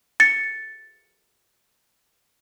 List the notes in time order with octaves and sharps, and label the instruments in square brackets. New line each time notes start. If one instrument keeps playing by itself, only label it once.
[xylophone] A6 C#7